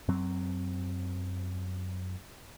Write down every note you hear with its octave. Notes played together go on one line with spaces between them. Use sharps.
F#2 F#3 C4